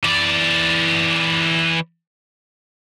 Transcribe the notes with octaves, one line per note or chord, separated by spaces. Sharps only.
E3 D5